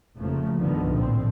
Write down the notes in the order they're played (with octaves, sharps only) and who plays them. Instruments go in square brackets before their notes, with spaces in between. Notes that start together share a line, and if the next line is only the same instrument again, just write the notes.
[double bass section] F1 C#3 F3 A3 A#3
C2 G2 D3 D#3 F3 B3
A#1 A2 F3 C4